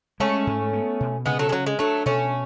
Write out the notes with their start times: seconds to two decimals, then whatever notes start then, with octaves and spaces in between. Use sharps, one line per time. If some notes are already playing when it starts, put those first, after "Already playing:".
0.20 G#3 A3 C#4
0.47 G#2
0.73 B3
1.00 B2
1.26 C#3 G#3 B3
1.39 F#3 A3
1.49 G#3
1.52 F#3 C#4
1.66 G#3
1.79 F#3 A3 D4
2.06 B2 A3 C#4